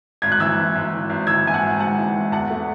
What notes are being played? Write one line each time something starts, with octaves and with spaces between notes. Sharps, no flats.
G#1 G#6
F#6
E3 E6 G#6
G#1
G#1
E3
G#1
E3 E6 G#6
G#1 G#5
F#5 A5
G#1
G#2 F#5 A5
E3
G#1
E2 F#5 A5
A3